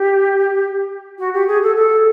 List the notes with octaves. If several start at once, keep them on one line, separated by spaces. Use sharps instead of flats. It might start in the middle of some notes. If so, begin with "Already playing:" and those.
Already playing: G4
F#4
G4
G#4
A4
A4